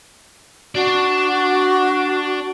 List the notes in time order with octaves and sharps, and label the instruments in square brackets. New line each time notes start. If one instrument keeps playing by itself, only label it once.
[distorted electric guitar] D4 D5 [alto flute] F#4